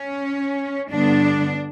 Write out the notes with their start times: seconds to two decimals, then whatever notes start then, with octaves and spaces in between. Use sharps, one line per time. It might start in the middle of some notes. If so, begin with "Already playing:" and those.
Already playing: C#4
0.89 G2 D3 G3 B3 D4